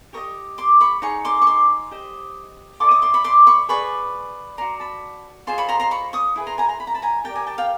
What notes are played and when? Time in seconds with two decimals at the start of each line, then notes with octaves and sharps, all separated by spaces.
0.13 G4 A#4 D#5 C#6 D#6
0.58 C6 D6
0.80 B5 C#6
1.02 D#4 G#4 C#5 C#6
1.25 C6 D6
1.42 C#6
1.47 C6 D6
1.91 G4 C5 D#5
2.80 E4 A4 D5 C6 D6
2.91 C#6 D#6
3.02 C6 D6
3.14 B5 C#6
3.24 C6 D6
3.47 B5 C#6
3.69 G#4 B4 D5 B5 C#6
4.58 F#4 B4 D5 A#5 C6
4.80 A5 B5
5.47 F4 G#4 C5 D#5 C6
5.58 B5 C#6
5.69 A#5 C6
5.80 A#5 C6
5.91 B5 C#6
6.13 C#6 D#6
6.36 E4 G#4 B4
6.47 A#5 C6
6.58 G#5 A#5
6.69 A#5 C6
6.80 B5
6.87 A#5
6.94 A5 B5
7.02 G#5 A#5
7.24 G4 A#4 D5 G5 A5
7.35 G#5 A#5
7.47 G5 A5
7.58 F5 G5